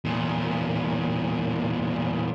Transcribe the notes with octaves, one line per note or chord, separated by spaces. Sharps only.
E2 A#2